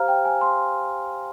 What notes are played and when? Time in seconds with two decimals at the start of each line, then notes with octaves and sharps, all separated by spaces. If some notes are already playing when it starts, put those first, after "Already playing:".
Already playing: G4 C5 F5 A#5 F6
0.08 G5
0.25 G#5
0.41 C6